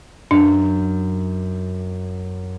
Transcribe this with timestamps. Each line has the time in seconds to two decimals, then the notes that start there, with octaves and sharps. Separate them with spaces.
0.31 F#2 D4